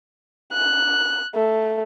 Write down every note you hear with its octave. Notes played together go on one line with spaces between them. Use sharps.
F#6
A3